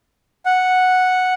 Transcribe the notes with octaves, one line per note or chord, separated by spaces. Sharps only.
F#5